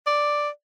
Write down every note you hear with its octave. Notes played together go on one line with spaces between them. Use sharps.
D5